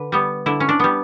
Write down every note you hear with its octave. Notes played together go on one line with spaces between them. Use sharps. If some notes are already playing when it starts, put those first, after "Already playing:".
Already playing: D3 B4
G3 B3
D3 E4
C#4
D4
G3 B3